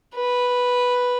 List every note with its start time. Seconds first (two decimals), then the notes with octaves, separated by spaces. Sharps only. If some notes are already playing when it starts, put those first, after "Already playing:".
0.15 B4